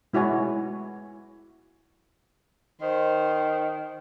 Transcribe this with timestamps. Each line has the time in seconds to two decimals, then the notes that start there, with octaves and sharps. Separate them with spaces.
0.13 G#3 E4 F#4 C#5 G#5
2.81 D#3 C5